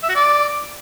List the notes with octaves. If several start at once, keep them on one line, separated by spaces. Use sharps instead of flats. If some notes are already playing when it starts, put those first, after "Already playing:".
E5
F#4
D5